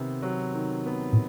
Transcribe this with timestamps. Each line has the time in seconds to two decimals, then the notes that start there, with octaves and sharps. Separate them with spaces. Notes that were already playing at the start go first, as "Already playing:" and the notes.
Already playing: C3 D#3 B3
0.22 F#3
0.54 D#3
0.86 B3
1.13 A2